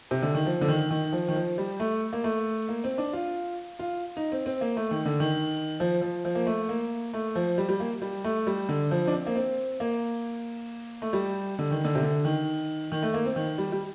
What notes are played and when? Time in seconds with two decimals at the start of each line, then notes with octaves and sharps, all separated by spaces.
0.11 C3
0.22 D3
0.34 D#3
0.46 F3
0.61 D3
0.68 D#3
0.91 D#3
1.12 F3
1.28 D#3
1.36 F3
1.58 G3
1.80 A3
2.13 A#3
2.24 A3
2.69 A#3
2.84 C4
2.98 D4
3.13 F4
3.79 F4
4.17 D#4
4.32 C4
4.46 C4
4.61 A#3
4.77 A3
4.91 D#3
5.05 D3
5.20 D#3
5.80 F3
6.01 F3
6.25 F3
6.35 A#3
6.47 A3
6.69 A#3
7.13 A3
7.35 F3
7.58 G3
7.69 G3
7.80 A#3
8.02 G3
8.24 A3
8.47 G3
8.69 D3
8.91 F3
9.07 D4
9.13 C4
9.26 A#3
9.36 C4
9.80 A#3
11.02 A3
11.13 G3
11.59 D3
11.71 D#3
11.84 D3
11.95 C3
12.03 D3
12.25 D#3
12.92 D#3
13.03 A3
13.14 A#3
13.25 C4
13.36 D#3
13.58 G3
13.72 G3